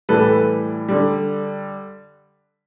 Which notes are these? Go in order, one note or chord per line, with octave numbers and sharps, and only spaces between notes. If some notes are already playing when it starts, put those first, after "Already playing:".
A2 E3 G3 A4 B4
D3 G3